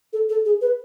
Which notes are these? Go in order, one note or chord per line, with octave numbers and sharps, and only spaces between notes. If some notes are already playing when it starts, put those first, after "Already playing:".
A4
A4
G#4
B4